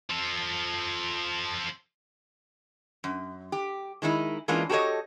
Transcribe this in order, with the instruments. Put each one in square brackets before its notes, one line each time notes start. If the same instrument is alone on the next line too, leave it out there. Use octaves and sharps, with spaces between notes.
[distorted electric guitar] F3 A4
[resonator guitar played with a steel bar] F#2
G4
D#3 G#3 D#4 E4
E3 G#3 A#3 C#4 D4 F4
F#4 G4 A4 B4 C#5 D#5